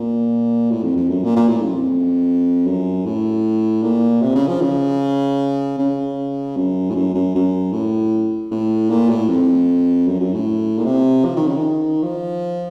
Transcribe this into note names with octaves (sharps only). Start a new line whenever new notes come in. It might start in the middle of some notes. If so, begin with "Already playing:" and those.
Already playing: A#2
A2
F2
F2
F#2
A#2
A#2
A2
F#2
F2
F#2
A2
A#2
C3
C#3
F3
C#3
C#3
F#2
A2
F#2
F#2
F#2
A2
A2
A#2
A2
F2
F#2
F#2
A2
A#2
C3
F3
D#3
C#3
D#3
F3